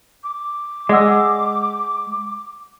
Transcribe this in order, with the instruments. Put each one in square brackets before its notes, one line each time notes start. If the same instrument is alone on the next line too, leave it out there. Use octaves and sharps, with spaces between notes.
[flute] D6
[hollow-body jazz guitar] G#3 [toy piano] D5 F#5 E6